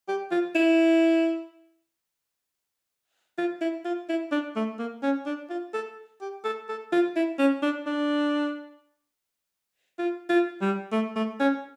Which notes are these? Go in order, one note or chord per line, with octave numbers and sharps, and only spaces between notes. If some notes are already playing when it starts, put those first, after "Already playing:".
G4
F4
E4
F4
E4
F4
E4
D4
A3
A#3
C#4
D4
F4
A4
G4
A4
A4
F4
E4
C#4
D4
D4
F4
F4
G3
A3
A3
C#4